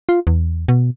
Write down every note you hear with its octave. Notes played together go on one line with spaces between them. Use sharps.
F4
E2
B2